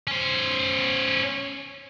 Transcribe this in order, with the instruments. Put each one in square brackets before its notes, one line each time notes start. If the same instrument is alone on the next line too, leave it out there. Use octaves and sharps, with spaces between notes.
[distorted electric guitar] C#4 C5